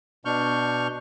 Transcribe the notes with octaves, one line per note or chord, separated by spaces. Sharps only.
B2 D4 C#6 F6 G6